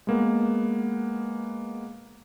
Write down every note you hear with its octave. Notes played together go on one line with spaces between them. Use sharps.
G#3 A#3 B3